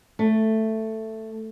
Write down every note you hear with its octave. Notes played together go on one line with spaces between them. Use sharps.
A3